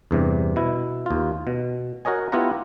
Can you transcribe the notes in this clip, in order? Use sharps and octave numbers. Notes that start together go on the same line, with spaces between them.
E2 G2 C3
B2 E4
D#2 F4
B2
F#4 A#4 C#5 D#5 G#5
B3 E4 F4 G4 F#5 A#5